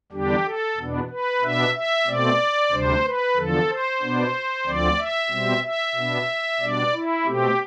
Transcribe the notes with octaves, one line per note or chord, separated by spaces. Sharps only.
E2 D3 G3 D4 G4
A4
E2 B2 B3 D4
B4
B2 B3 D4 E5
E5
B2 A3 C4 D5
D2 C3 G3 D4 C5
B4
E2 D3 F3 A4
C5
B2 B3 D4
D2 D3 F3 C4 D5
E5
B2 G3 C4
E5
B2 B3 D4
B2 G3 D4 D5
E4
B2 A3 C4 G4